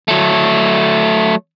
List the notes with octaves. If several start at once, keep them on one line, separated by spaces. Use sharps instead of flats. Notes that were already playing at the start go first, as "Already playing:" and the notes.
F#3 A3